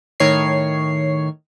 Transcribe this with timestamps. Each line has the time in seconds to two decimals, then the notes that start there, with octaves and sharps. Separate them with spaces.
0.20 A2 D#3 C#5 C7